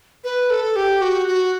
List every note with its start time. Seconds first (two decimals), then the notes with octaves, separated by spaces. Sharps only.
0.24 B4
0.50 A4
0.76 G4
1.01 F#4
1.28 F#4